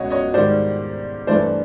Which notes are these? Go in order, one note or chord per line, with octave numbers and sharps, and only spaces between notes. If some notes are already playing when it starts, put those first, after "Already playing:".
Already playing: C#2 B2 C#5 D#5 F#5
C#5 D#5
G#2 D#3 G3 C5 D5
G2 E3 A3 C5 D5